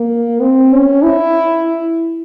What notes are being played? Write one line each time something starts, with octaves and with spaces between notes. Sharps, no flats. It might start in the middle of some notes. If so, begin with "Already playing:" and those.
Already playing: A#3
C4
C#4
E4